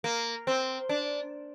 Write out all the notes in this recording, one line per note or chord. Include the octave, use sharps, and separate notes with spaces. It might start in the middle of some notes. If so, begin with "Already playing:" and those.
A#3
C4
D4